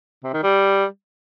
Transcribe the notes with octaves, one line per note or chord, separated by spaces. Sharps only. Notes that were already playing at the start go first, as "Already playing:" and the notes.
C3
D#3
G3